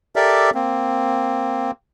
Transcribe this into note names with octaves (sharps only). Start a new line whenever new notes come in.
G4 A4 A#4 D5 E5
A#3 C4